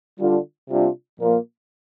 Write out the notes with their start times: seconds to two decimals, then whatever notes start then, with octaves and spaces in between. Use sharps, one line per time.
0.20 D3 G3 D4 F4
0.70 C3 G3 D4 F4
1.18 A#2 F3 A#3 F4